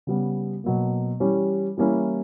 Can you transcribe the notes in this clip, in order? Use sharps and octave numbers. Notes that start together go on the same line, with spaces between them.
C#3 G3 B3
B2 F#3 A#3
E3 G3 C#4 G4 C#5
E3 G3 A#3 C#4 E4